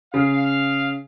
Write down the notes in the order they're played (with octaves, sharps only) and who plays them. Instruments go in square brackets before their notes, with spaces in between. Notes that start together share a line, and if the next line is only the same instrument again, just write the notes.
[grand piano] C#3 [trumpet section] F5